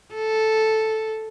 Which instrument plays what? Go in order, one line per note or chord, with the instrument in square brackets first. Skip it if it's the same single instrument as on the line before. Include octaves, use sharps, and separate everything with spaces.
[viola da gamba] A4